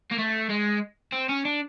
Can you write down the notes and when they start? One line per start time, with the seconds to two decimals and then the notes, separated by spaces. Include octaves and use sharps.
0.11 A#3
0.18 A3
0.49 G#3
1.13 C4
1.29 C#4
1.45 D4